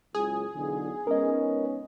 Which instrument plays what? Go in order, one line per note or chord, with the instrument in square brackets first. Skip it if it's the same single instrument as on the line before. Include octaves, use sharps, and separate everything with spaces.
[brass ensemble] F#1 C#2 [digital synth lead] G#4
[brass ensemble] B1 E2 D3
[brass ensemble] G#2 B3 C#4 [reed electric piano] A#4 D#5